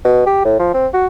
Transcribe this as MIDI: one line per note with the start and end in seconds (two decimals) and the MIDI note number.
0.05 0.25 47
0.26 0.44 67
0.45 0.59 45
0.59 0.71 53
0.74 0.87 60
0.94 1.07 66